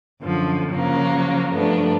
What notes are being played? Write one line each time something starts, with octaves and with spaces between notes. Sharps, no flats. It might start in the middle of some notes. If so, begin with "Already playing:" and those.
F#2 D3 F3
C#3 F3 F#3 A#3
G2 F3 A3 B3 D4